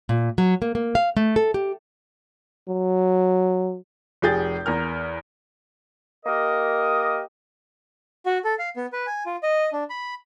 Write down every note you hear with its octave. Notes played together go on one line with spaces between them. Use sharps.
A#2
F#3
A#3
A#3
F5
A3
A4
G4
F#3
F1 G4 G#4 G6 A6
E2 A#4 F6
A#3 G4 A#4 D#5
F#4
A4
F5
B3
B4
G#5
F4
D#5
D4
B5